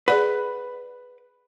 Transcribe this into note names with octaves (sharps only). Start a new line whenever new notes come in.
G#4 B4 D5 F#5